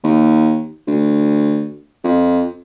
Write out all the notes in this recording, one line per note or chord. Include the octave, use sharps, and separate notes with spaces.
D#2
D2
F2